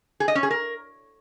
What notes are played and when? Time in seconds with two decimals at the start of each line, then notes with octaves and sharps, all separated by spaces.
0.20 G#4
0.28 D#5
0.35 C#4
0.43 G#4
0.51 A#4